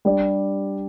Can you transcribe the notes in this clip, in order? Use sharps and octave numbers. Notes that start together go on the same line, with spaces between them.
G3 D4 G4 D5